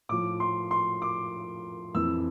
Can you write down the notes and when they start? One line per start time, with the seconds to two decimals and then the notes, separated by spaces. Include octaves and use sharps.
0.09 A2 F3 D6
0.40 C6
0.71 C6
1.02 D6
1.94 F2 E3 E6